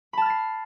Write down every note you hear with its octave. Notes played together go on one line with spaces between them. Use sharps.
A5 B5 F6 A6 C7